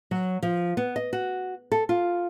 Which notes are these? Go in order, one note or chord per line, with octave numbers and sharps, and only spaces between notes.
F#3
F3
B3
D#5
F#4
A4
F4